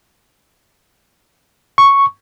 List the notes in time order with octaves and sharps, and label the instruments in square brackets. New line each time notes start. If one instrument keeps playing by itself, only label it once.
[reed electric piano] C#6